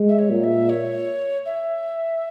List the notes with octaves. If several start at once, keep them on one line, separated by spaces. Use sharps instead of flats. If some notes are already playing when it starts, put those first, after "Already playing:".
Already playing: G#3
E5
C#5
A#2
E5
C#5
E5